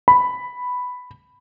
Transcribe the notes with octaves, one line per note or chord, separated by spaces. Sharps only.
B5